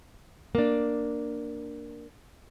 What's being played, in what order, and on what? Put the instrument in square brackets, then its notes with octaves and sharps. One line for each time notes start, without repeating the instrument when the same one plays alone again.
[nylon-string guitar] A#3 D4